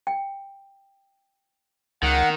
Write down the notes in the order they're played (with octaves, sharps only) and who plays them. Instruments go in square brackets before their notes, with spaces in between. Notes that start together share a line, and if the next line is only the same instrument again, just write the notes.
[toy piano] G5
[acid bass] C#2 [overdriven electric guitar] D#3 [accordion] F#5